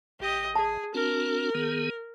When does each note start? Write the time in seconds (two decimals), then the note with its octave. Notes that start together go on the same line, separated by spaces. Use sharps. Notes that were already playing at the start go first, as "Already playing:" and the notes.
0.20 A1 G4 D#5
0.56 G#4 A5
0.94 C4 D4 F#4 A#4
1.55 D#3 B3 G#4